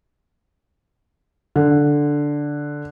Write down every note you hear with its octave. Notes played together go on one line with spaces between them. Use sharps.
D3